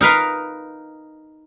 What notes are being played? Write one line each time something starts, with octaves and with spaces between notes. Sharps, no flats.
D#4 A#4 B4 F5